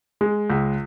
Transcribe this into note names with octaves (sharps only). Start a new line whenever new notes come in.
G#3
C#2